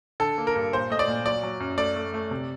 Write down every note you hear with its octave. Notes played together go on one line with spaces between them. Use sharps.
D3 A4
A#3
A#4
G2
A#2 C5
A3 D#5
D5
A#2
F#3 D5
F#3
F#2
A3 D5
A3
A3
C3